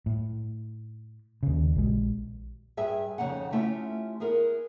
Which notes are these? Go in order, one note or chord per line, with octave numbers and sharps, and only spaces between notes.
A2
D#2 C#3
A#1 G#3
G2 G#4 E5 G#5
F2 C#3 A3 C4 D#4 F#5
A3 C#4 E4 F4 G4 E5
B3 E4 G#4 A#4